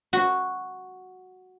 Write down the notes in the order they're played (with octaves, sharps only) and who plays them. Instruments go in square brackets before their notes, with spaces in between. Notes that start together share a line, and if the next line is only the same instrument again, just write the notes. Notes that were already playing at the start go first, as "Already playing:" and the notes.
[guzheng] F#4